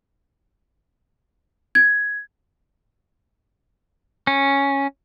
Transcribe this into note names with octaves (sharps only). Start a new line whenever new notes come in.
G#6
C#4